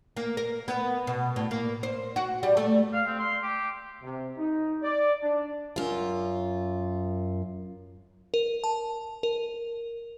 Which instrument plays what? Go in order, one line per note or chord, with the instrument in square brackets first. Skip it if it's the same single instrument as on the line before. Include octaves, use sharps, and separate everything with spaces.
[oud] A#3
A#4
B3
B2
A2
A#3
C5
F#4
G3
A3
[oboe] F5
C4
C6
G4
[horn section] C3
D#4
D5
D4
[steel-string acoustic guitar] F#2 F4
[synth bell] A#4
A5
A#4